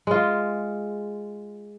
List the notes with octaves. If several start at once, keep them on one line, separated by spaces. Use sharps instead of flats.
G#3 F4